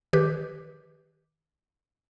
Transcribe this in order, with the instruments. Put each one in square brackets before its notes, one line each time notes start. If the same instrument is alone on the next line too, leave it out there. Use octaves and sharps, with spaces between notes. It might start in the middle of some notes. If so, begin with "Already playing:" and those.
[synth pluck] D#3 G4 B4